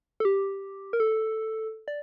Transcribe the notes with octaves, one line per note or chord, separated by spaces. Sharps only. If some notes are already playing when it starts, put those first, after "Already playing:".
A4
G4
A#4
A4
D5